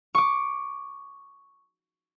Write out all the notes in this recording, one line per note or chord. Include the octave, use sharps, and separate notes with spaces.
C#6 D6